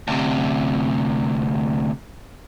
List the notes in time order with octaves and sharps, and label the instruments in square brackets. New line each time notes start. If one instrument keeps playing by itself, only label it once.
[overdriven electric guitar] D2 C3